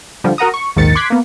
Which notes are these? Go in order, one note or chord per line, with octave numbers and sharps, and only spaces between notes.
D3 F3 G3
F#4 A#4 F#5 A#5 D#6
C#6
A#1 D#2 G#2 D#3 A6 C#7
C6 D6 F#6 G#6 B6
A#3 B3